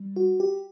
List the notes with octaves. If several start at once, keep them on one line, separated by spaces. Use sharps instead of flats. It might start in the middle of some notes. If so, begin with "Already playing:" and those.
Already playing: G3
F#4
G4